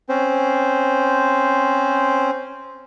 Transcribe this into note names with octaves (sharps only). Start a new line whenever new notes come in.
C4 C#4 C5